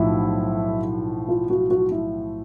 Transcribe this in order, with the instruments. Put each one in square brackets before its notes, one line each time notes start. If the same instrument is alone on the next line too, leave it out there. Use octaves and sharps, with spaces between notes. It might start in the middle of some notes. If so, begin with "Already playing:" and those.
Already playing: [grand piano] B1 A2 F3 [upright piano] E4
[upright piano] F4
F#4
F#4
E4